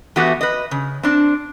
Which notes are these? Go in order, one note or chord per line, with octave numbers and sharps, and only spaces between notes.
E3 A3 B3 F#4 G4 B4
B4 D#5
C#3
C4 D4